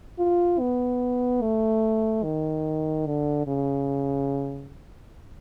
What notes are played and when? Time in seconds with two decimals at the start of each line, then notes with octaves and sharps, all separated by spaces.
0.19 F4
0.60 B3
1.42 A3
2.24 D#3
3.06 D3
3.47 C#3